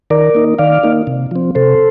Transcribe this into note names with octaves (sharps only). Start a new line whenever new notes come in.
D#3 A#4 D5
A#3 D#4
D#3 D5 F5
A#3 D#4
C3
F3 C4
C3 A4 C5